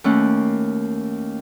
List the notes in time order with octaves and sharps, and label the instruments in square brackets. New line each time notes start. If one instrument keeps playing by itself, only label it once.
[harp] D#2 A3 C#4 F#6